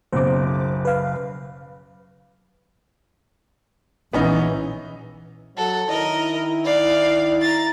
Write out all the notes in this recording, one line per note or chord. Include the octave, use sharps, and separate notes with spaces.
F#1 B1 C#3 C5 D6
B4 F5
A#1 E3 B3 C#4 D#4
F#3 A4 F#5
D#3 E4 A#4 D#5
D5 F5
A#5 A6